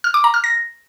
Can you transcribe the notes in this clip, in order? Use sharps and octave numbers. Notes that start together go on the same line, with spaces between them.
F6
D6
A#5
F6
A#6